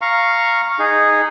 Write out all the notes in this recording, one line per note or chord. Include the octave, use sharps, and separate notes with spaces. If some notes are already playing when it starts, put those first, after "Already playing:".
F5 A#5 C#6
D#4 G#4